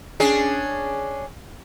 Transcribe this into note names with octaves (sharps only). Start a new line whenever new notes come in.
C#4 D4 G#4